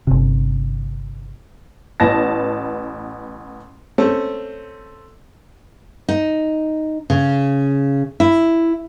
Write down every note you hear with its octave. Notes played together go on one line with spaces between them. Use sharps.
G1 C3
A1 B3 A5 A#6
A3 C4 C#4
D#4
C#3
E4